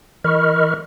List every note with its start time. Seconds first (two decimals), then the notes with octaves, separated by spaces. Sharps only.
0.24 E3 A#4 D#5 B5 C#6 F6